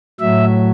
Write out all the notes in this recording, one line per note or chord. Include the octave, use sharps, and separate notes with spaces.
A2 F#3 E5